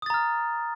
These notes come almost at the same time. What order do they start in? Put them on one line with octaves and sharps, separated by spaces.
D#6 A6 A#5 F6